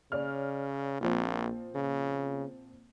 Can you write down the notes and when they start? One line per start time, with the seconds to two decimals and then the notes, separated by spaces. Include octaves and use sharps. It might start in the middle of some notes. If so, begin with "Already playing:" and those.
0.12 C#3 C#5 D5 F6
1.01 A#1 A#2 F3 C4
1.75 C#3